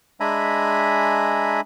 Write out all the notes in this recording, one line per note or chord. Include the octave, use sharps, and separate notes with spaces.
G#3 D4 E5 G#5 A#5 B5